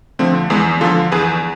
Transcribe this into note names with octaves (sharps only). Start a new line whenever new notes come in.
D3 F3 A3 C4
E2 G#3 B3
D3 F3 F4 A4
E2 G#4 B4